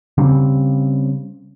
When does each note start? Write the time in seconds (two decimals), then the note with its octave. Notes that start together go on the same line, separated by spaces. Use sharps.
0.18 C#3 G3 A#3 C4